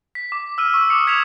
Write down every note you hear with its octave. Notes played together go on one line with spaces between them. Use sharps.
B6
D6
E6 F6 D#7
C#6 E6
D6 D#6 C#7
E6 G#6 B6 C#7 E7 F7